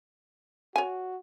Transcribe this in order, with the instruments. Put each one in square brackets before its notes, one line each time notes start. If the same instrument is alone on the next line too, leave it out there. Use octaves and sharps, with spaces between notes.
[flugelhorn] F#4 [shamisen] C#5 G#5